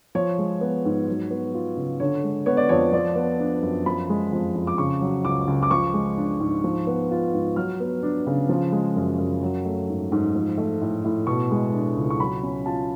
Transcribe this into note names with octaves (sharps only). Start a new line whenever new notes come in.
F3 C#5
G#3
B3
G#2
F#3
B3
F4
C#3
D3 C#5
G#3
B3 C#5
D5
F2 C#5
F3 D5
B3
D4
F#2
F3 B5
G#3
F2
F2
D6
C#3 C#6
F#3
C#2 D6
C#2
D6
F3 C#6
G#3
D4
G#2
F3
B3
F4
G#2
F#3 F6
B3
D4
C#3
F3
G#3
F#2
F#2
F#3
A3
G#2
G#2
F3
A3
A2
A2
B2 C#6
G#3
D4
C#2
C#6
F#3 B5
C#4
F4 A5